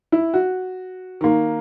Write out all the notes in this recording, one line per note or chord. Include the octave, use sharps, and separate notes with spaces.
E4
F#4
D#3 A#3